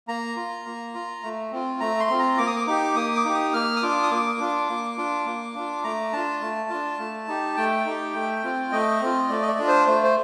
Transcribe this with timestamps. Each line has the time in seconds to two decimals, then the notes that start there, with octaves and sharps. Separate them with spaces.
0.08 A#3 A#5
0.36 F4
0.66 A#3
0.94 F4
1.23 A3
1.52 C4 F4
1.80 A3 A#5
2.00 C6
2.10 C4 F4
2.19 A#5
2.38 A#3 D6
2.47 D#6
2.56 D6
2.67 D#4 G4 D6
2.95 A#3 D#6
3.15 D6
3.25 D#4 G4
3.34 D#6
3.53 A#3 F6
3.76 D#6
3.82 D4 F4 D6
4.03 D#6
4.11 A#3 D6
4.40 D4 F4
4.69 A#3
4.98 D4 F4
5.26 A#3
5.55 D4 F4
5.84 A3 A#5
6.13 D4 F4 A5
6.41 A3
6.70 D4 F4
6.99 A3
7.28 D#4 G4
7.56 A3 G5
7.85 D#4 G4
8.14 A3
8.43 C4 F4
8.72 A3 D#5
9.01 C4 F4
9.29 A3 D5
9.42 D#5
9.48 D5
9.59 D4 F4
9.68 C5
9.87 A3 C5
10.04 C5